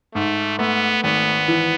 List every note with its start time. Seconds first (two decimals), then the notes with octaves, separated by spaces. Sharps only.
0.14 G#2 A3
0.59 A3 B3
1.04 G#1 B3
1.48 E3